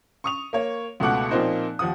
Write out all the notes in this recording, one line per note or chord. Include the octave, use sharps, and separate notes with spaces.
C#6 D#6 F7
A#3 C#5
C#2 B2 A3 F#5 D6 F#6
A#2 F3 A#3 C4 D#4 C5
D#2 F3 F#5 D#6